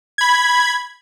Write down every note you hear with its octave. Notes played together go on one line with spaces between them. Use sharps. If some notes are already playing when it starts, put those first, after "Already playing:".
B5 G#6